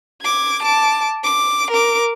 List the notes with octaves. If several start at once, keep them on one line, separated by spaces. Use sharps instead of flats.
D6 G#6
A5 D6
D6
A#4 D6